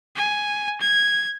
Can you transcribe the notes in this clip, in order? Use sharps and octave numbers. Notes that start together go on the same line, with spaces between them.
G#5
G#6